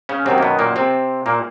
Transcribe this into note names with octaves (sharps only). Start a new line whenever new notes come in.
C#3 C#4
F#2 C3 D#3 F#3 C4
A#3
B2 B3
A#2 A#3
C3 C4
A#2 A#3